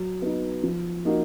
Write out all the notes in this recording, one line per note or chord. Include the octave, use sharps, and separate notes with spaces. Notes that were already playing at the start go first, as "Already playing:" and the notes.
Already playing: F#3
B3 D#4
F3
A#3 D#4 F#4